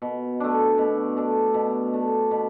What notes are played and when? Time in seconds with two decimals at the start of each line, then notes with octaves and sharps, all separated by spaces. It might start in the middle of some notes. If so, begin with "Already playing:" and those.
0.02 B2
0.40 A3 D4
0.78 B2
1.17 A3 D4
1.54 B2
1.93 A3 D4
2.31 B2